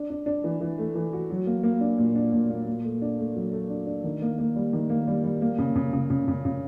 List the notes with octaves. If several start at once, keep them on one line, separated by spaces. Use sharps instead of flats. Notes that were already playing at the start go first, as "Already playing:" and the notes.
Already playing: D4
D4
D4
E3
E3
A3
E3
F#4
F#3
A#3
A#3
D4
A#2
D4
A#2
A#3
A#2
A3
D4
A3
F#3
A3
D4
D4
D#3
A#3
A#3
G3
D#3
A#3
G3
G3
A#3
C#3
C#3
C#3
C#3
C#3
C#3